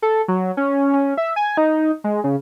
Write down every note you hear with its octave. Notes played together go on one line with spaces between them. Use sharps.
A4
F#3
C#4
C#4
E5
G#5
D#4
G#3
C#3